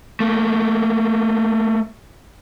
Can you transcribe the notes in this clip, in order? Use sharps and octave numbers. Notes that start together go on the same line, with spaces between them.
A3 A#3